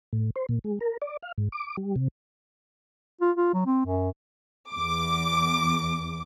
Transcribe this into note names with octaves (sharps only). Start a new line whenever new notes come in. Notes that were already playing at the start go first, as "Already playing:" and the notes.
A2
C5
A#2
G#3
A#4
D5
F5
G#2
D6
G3
C3
F4
F4
F#3
C4
F#2
E2 D6